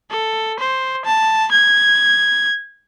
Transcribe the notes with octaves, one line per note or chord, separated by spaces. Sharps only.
A4
C5
A5
G#6